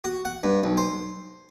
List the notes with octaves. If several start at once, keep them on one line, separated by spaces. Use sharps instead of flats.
F#4
F#5
G2
B1
C5